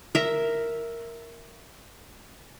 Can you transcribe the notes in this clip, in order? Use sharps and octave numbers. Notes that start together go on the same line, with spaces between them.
A#4 E5